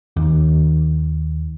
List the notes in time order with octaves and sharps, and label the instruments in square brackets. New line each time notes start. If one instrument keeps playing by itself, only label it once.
[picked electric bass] D#2